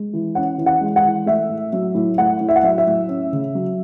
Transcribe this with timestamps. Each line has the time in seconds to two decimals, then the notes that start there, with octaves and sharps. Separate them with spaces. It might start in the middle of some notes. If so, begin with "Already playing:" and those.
Already playing: G#3
0.13 E3
0.35 C#4 F#5
0.58 E3
0.66 F#5
0.81 G#3
0.96 F#5
1.04 E3
1.26 A3 E5
1.49 A2
1.73 F#3
1.95 A2
2.18 A3 F#5
2.41 A2
2.49 E5
2.56 F#5
2.63 F#3 E5
2.78 E5
2.87 A2
3.08 C#4
3.32 C#3
3.55 F#3